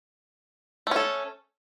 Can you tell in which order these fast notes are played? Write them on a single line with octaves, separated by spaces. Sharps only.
A3 C#4 A4